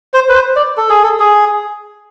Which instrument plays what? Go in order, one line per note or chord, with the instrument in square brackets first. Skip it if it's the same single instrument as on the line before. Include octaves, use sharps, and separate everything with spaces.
[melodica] C5
B4
C5
D5
A4
G#4
A4
G#4